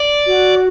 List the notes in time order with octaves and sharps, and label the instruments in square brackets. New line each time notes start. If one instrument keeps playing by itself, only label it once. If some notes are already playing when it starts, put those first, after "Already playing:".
Already playing: [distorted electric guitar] D5
[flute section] F#4